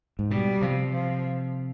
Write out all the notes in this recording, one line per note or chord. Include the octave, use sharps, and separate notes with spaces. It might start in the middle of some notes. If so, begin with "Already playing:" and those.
G#2
B2 G3
C3 F3
F3